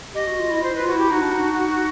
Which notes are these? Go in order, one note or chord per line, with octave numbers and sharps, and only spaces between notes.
G4 D#5
F#4
F4
E4
F4 C5
E4 B4
F4
E4 F#4
G4
D#4 F#4
D4
D#4